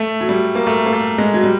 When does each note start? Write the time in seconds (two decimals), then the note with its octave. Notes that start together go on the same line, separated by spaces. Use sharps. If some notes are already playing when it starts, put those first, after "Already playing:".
Already playing: A3
0.21 F#3
0.29 G3
0.55 A#3
0.66 A3
0.86 A#3
0.93 A3
1.18 G#3
1.34 F#3
1.43 G3